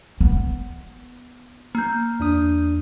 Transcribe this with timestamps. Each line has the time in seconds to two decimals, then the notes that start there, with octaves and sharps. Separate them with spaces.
0.21 B3
1.75 A#3 G6
2.20 E2 D4 D#6